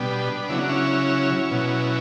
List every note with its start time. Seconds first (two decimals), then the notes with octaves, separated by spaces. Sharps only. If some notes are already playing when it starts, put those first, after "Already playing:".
Already playing: B2 G3 B3 D4
0.49 C#3 F#3 E4
0.59 D4
0.69 C#4 E4
1.51 B2 F#3